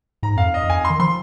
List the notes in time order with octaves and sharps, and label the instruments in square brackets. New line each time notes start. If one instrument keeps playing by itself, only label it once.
[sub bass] G#2 [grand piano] A#5
[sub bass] F2 [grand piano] F5
[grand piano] D#5
[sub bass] F2
[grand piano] G#5
C6
[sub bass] D#3
[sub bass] F3 [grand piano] C6